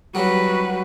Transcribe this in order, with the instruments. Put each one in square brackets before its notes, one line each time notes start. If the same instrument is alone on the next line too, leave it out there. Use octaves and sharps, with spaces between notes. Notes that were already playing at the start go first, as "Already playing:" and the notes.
[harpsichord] F#3 G3 [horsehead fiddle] F#4 B4